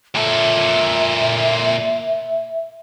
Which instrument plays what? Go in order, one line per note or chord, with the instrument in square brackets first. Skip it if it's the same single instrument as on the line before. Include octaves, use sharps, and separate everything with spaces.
[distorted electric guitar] A#2 A4 [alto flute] E5